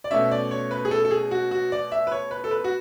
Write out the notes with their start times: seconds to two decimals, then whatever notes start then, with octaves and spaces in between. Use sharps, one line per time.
0.04 D5
0.11 B2 A3 C#4 E5
0.31 D5
0.51 C#5
0.71 B4
0.85 G#4
0.91 A4
1.05 A4
1.11 G#4
1.31 F#4
1.51 F#4
1.72 D5
1.92 E5
2.07 B4
2.12 C#5
2.31 B4
2.44 A4
2.51 B4
2.64 F#4